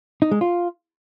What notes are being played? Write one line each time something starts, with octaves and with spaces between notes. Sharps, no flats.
D#4
G#3
F4